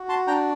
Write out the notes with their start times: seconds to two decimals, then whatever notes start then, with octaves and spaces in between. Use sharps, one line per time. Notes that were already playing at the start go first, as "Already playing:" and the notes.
Already playing: F#4
0.09 A5 C6
0.27 D4 G5 A#5